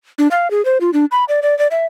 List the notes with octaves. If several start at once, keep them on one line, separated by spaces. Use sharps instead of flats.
D4
F5
G#4
C5
F4
D4
B5
D5
D5
D5
E5